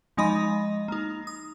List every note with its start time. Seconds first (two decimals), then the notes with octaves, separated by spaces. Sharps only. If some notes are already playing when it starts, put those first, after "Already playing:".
0.17 F3 G#3 D#4 D#5 B5
0.88 A#3 D#4
1.27 D#6